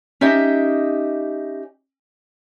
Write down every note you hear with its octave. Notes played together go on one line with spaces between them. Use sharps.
C#4 D#4 G4 D#5 E5